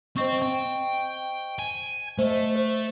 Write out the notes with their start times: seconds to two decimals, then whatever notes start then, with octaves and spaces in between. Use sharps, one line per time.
0.16 C4 C5 D#5 G5 C#6
0.42 G5
1.59 G#5
2.18 A3 C5 D#5
2.56 C5